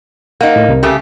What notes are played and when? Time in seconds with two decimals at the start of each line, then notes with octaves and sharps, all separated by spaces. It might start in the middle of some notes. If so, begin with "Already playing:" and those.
0.41 A#3 D#4 F#5
0.56 A2
0.69 C2 C3 A#4
0.83 C#3 A3 G4